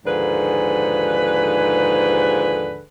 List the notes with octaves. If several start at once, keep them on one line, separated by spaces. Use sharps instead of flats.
D#2 G#2 D3 F3 G#4 B4